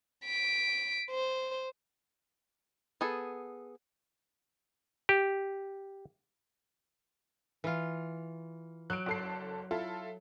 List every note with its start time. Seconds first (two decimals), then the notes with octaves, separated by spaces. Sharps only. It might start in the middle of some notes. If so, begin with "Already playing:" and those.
0.24 B6 D7
1.10 C5
3.01 B3 G#4 A4
5.09 G4
7.64 E3 F4
8.90 F#3 F#6 D7
9.06 F#1 A4 C7
9.71 E4 F4 A4